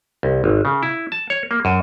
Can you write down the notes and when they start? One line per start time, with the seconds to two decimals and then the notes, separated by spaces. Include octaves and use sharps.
0.23 C2
0.44 G#1
0.65 C#3
0.83 E4
1.12 A5
1.30 C#5
1.51 A#3
1.65 F#2